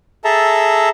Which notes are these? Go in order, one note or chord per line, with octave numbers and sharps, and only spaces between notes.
G#4 A4 E5 A5 A#5